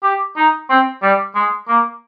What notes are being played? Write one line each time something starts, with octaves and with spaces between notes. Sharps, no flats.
G4
D#4
C4
G3
G#3
A#3